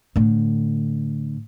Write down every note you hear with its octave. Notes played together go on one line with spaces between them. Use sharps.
A2 D3